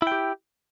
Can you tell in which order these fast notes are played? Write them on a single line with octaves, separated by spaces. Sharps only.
E4 G5 G4